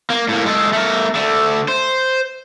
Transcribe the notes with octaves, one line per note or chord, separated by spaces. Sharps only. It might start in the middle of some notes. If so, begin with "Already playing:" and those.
A#3
A2 A#3
G#3 A4
A3 A#4
D3 A3
C5